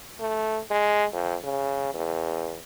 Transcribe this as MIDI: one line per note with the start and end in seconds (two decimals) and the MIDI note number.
0.20 0.59 57
0.70 1.04 56
1.13 1.35 41
1.44 1.92 49
1.94 2.58 40